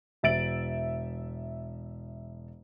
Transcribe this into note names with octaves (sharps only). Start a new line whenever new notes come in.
E1 E5 A6 D7 F#7